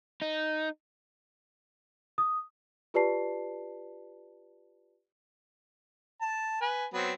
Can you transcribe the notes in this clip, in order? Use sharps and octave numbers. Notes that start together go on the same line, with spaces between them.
D#4
D#6
F4 G4 B4 D5 A5 C7
A5
B4 G#5
F#3 B3 C4